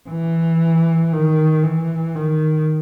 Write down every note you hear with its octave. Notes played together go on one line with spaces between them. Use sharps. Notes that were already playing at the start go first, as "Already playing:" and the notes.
E3
D#3
E3
D#3